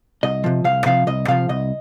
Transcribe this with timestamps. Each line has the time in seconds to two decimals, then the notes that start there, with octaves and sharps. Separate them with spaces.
0.23 C2 D#5
0.44 C3 F3
0.64 C2 F5
0.86 C3 F3 F5
1.07 C2 D#5
1.28 C3 F3 F5
1.49 C2 D#5